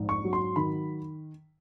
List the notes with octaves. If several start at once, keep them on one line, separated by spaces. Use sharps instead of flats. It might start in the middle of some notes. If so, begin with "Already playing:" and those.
Already playing: A#1 G#2
C#6
F#3
C6
D#3 B5